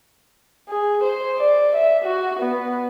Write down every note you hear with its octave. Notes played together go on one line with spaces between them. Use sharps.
G#4
C5
D5
E5
F#4
B3